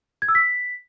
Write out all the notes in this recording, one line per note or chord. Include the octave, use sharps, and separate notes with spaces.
G#6
E6
B6